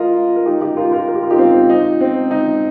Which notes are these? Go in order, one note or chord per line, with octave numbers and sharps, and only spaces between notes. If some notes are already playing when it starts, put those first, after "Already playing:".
Already playing: F4 A#4 D#5
A#4
D#4 G4
D#4 G4
F4 A#4
F4 A#4
A#4
G4
F4
D#4 G4
C4 F4
D#4
C4
D#4